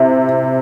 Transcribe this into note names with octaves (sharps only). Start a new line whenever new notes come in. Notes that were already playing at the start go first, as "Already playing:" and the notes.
Already playing: C3 E4